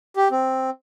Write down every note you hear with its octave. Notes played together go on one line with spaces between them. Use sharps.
G4
C4